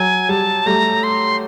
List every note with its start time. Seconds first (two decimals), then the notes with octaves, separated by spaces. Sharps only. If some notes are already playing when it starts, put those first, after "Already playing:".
Already playing: F#3 G#5
0.29 G3 A5
0.66 G3 A3 A#5
1.03 C6